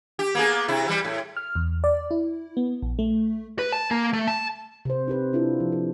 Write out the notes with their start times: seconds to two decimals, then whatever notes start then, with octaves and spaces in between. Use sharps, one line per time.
0.19 G4
0.35 A#3 B3 G#4
0.68 C3 E4
0.86 E3 F3 G3
1.05 A2
1.37 F6
1.55 E2
1.84 D5
2.11 E4
2.57 B3
2.83 A#1
2.99 A3
3.59 B4
3.72 A5
3.91 A#3
4.13 A3
4.27 A5
4.85 C3 C5
5.08 D#4 G4 B4
5.33 D4 E4 F4 A4
5.60 F3
5.72 A4